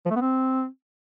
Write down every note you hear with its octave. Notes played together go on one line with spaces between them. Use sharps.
F3
A3
B3
C4